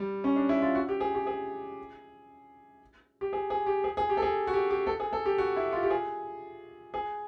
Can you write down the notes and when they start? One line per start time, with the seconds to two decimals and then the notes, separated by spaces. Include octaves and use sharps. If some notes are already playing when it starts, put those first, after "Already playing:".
Already playing: G3
0.24 C#4
0.36 D4
0.49 E4
0.62 F4
0.75 F#4
0.89 G4
1.00 G#4
1.15 G4
1.27 G#4
3.21 G4
3.33 G#4
3.50 G#4
3.66 G4
3.84 G#4
3.97 G#4
4.10 G4
4.17 A4
4.22 G#4
4.47 F#4
4.53 G4
4.70 G4
4.87 A4
5.00 G#4
5.13 A4
5.26 G4
5.38 F#4
5.56 E4
5.72 F4
5.83 G4
5.90 G#4
6.94 G#4